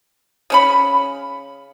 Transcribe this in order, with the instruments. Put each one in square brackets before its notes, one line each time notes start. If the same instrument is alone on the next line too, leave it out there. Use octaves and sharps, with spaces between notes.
[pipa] C#3 C#4 B5